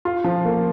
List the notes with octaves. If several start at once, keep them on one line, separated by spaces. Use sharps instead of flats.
F4
F3
A#3